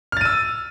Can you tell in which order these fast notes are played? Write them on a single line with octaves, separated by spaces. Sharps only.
F6 A6 D#7 E6